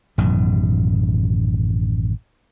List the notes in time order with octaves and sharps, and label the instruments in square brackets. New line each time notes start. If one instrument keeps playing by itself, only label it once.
[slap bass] A1 F#2 B2 D#3